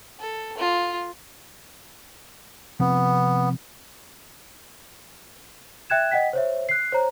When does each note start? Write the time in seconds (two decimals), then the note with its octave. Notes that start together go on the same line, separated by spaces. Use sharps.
0.19 A4
0.57 F4
2.80 C3 F3 B3 C4
5.90 E5 G5 F#6 G#6 E7
6.11 D#5 F#5 G5 B6
6.33 C5 C#5 E5
6.69 F#6 C7
6.92 C5 C#5 A#5